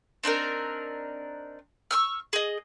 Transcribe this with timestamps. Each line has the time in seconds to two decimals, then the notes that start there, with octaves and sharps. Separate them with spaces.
0.24 C4 D4 D#4 A#4
1.91 C#6 E6 F6
2.33 G#4 D#5